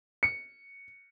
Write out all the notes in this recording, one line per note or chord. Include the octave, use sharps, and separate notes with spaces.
C#7